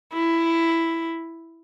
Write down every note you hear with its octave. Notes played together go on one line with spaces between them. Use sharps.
E4